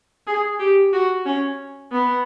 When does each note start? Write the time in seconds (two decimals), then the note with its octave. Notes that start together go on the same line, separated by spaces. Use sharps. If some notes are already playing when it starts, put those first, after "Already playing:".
0.27 G#4
0.59 G4
0.93 F#4
1.26 C#4
1.92 B3